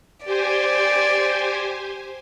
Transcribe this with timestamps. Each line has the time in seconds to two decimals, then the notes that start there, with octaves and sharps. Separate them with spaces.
0.24 G4 C5 D5 G#5